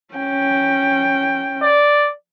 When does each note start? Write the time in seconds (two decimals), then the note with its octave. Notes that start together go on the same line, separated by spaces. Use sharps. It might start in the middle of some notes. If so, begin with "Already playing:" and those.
0.14 C#4 G5
1.62 D5